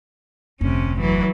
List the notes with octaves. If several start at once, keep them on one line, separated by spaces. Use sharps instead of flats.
F1 D2 C3 C#4
E3 F#3